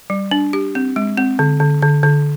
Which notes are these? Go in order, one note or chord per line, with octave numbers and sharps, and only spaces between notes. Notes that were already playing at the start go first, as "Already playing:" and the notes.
G3
D4
G4
C4
G#3
C4
D3
D3
D3
D3